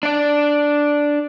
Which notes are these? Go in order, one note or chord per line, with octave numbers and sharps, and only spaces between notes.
D4 D5